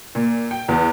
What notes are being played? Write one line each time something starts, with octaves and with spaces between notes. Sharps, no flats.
A#2
G5
E2